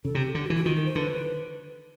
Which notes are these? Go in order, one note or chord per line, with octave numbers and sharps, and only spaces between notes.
C#3 A4
C3
G4
D3
F#4
E3
F#4
D#3 F4
A#4
C5
D3 B4